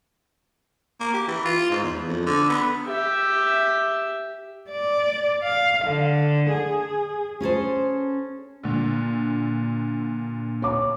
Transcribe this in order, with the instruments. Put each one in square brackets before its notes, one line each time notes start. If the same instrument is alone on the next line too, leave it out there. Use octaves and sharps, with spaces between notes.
[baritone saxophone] A#3
G4
E3
F4
G#2
E2
F2
D3
B3
[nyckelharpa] G4 E5
[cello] D5
F5
D3
G#4
[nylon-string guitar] C#4 G#4 A4 C5
[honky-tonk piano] A#2 D3
[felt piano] C#5 D6